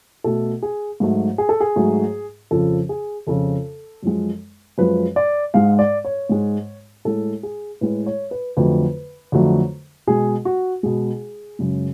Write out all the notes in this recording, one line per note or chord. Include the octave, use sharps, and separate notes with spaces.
B2 A3 A4
G#4
G#2 F#3 A3
G#4
A4
G#4
G#2 F#3 A3
F2 C#3 F3 A4
G#4
F2 C#3 F3 A4
F#2 F3 G#3
F#2 F3 G#3 B4
D5
G#2 G#3 F5
D5
C#5
G#2 G#3
A2 G#3 A4
G#4
A2 G#3 B4
C#5
B4
F2 D3 F#3 A3 B4
F2 D3 F#3 A3
B2 G#3 G#4
F#4
B2 G#3 G#4
F#2 C#3 G#3